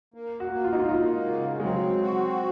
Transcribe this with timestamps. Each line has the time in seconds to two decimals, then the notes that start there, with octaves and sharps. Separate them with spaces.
0.14 A#3
0.40 F#4
0.51 A#3
0.64 F4
0.73 D#4
0.80 F4
0.89 A#3 D#4
1.26 C#3
1.60 G#3
1.64 F#3 C4
2.02 F#4